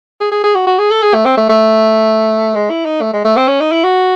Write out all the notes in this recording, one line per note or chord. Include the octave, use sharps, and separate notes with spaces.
G#4
G#4
G#4
F#4
F#4
G#4
A4
G#4
A3
C4
A3
A3
G#3
E4
D#4
A3
G#3
A3
C4
C#4
D#4
E4
F#4